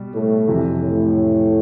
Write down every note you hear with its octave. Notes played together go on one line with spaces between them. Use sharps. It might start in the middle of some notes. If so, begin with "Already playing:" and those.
Already playing: B2 G3
A2
F2 C3 E3
A2